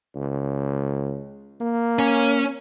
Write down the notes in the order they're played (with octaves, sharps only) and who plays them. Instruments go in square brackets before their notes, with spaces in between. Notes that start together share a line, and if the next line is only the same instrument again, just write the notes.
[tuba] C#2
A#3
[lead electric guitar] C#4